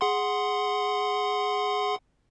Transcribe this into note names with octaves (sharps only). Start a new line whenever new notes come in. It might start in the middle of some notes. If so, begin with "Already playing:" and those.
G#4 F#5 C6